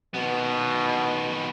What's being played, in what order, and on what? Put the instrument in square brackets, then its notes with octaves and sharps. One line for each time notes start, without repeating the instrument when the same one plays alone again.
[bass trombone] B2 [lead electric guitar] D#3 B3